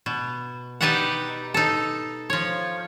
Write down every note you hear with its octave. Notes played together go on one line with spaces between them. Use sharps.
B2
D#4 G4 B4 D5 E5 F#5
D#4 A4
F3 C#5